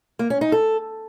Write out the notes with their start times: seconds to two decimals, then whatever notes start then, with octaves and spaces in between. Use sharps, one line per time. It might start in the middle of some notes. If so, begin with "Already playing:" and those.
0.19 A#3
0.30 C#4
0.41 D#4
0.52 A4